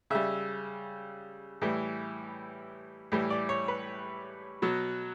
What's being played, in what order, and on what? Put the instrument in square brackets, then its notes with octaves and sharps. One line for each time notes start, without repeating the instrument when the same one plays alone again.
[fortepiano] C#3 G3 E5
A2 E3 G3
A2 E3 G3
D5
C#5
B4
B2 F#3